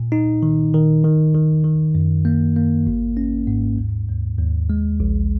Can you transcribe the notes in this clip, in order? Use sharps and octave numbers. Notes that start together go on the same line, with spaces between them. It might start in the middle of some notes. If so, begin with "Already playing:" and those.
Already playing: A#2
D#4
D#3
D#3
D#3
D#3
D#3
F#2
A#3
A#3
G#1
C#4
G#2
D#2
D#2
D#2
G#3
A#1